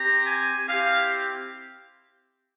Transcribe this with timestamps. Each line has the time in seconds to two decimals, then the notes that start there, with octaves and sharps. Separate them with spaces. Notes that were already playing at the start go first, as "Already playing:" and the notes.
Already playing: C4 G4 A#5
0.27 G#5
0.67 C4 E4 G4 F5